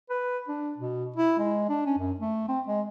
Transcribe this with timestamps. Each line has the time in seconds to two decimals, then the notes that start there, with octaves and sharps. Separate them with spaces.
0.10 B4
0.48 D4
0.78 B2
1.16 E4
1.39 G#3
1.69 D4
1.86 C#4
1.98 F#2
2.20 A3
2.48 C4
2.68 G#3